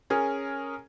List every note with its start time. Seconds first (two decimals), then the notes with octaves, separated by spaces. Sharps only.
0.10 C#4 G#4 A#4